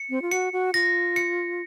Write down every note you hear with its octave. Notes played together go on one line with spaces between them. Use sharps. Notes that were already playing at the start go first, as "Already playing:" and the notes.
Already playing: C#7
C4
F4
F#4 C#7
F#4
F4 A#6
C#7